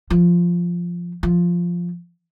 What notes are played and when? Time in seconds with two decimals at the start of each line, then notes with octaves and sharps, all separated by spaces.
0.10 F3
1.23 F3